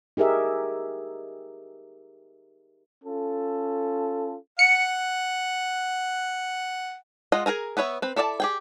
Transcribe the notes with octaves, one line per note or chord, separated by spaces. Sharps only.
D#4 G4 G#4 A#4 E5
C#4 F4 A4
F#5 C#7
G#3 F4 D#5 F#5
G#4 A#4 G#5 A#5
B3 B4 C#5 E5
C4 B4
E4 A4 D5 E5 A5
G4 G#4 G5